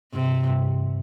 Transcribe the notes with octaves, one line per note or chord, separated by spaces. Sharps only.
G2 C3
G2